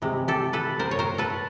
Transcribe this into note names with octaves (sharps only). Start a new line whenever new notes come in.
C3 E3 G#3
G4 A4
A4 B4
A#4 C5
C#5
A#4 C5
A4 B4